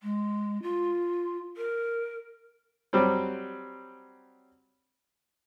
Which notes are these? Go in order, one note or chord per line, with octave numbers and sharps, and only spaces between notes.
G#3
F4
A#4
F#3 G3 C4